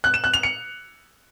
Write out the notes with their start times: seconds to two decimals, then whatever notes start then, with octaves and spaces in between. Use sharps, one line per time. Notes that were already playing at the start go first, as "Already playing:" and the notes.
0.04 F#6
0.14 E7
0.24 F#6
0.34 F7
0.43 C#7